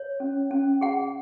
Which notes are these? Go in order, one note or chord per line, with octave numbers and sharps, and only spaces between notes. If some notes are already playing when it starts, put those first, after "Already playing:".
Already playing: C#5
C#4
C#4
G#4 F#5